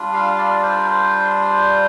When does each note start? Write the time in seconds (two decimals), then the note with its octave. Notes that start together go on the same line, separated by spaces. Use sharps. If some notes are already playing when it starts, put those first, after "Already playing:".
Already playing: G3 D4 F4
0.13 F5
0.38 D5
0.63 C5
0.76 A#4
0.90 C5